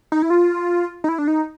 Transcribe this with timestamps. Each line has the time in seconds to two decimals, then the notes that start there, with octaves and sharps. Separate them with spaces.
0.12 D#4
0.22 E4
0.30 F4
1.04 D#4
1.09 E4
1.18 D4
1.28 D#4